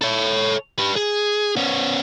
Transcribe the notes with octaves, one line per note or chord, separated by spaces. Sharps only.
A4 C#5
G4 B4
G#4
B3 C#4